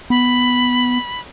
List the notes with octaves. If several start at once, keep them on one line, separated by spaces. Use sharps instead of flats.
B3 B5